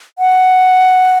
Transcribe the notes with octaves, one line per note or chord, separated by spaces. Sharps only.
F#5